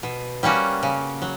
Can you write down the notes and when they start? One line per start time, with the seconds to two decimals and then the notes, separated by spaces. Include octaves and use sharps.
0.03 B2
0.43 G3 A#3 C#4 F#4
0.83 C#3
1.22 F#3